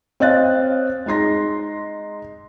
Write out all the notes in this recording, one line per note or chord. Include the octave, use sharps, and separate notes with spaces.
C4 C#5 D#5 F5 F#6 A6
G#3 D#4 C6 A#6